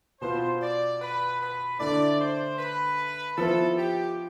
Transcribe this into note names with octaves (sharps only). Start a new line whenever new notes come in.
B2 B3 F4 C5
D5
B4
B4
D3 A3 E4 D5
C5
B4
F3 B3 E4 A4
G4